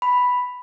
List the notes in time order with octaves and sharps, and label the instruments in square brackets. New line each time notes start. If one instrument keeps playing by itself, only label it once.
[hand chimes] B5